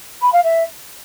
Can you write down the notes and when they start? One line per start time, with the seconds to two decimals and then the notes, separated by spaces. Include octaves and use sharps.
0.21 B5
0.32 F5
0.43 E5